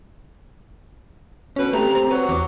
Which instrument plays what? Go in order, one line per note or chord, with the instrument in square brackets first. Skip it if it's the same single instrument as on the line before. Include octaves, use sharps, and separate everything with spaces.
[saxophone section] D2 B2 B4 [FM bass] C#4
[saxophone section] C3 [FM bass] A3 [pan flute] A#5
[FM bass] C4
[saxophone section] F#3 F#4 C#5 [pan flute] B4
[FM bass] E2 [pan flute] D6